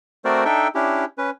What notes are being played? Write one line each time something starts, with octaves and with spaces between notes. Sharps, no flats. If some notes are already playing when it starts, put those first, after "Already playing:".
A3 C4 F#4 A#4 C5 D5
D4 D#4 A4 E5 G5
C#4 D4 E4 G4
C#4 B4